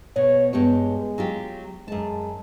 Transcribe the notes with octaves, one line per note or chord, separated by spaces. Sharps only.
B2 C#5
G2 G#3 B3 G4 C#5
F#3 F4 G4
F#2 G#3 A5